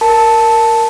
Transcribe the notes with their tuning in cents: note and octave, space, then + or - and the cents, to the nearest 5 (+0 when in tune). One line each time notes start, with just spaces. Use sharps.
A#4 +0 A5 +0